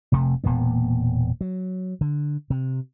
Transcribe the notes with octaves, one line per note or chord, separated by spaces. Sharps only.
F1 C3 A3
E1 A#2 A#3 B3
F#3
D3
C3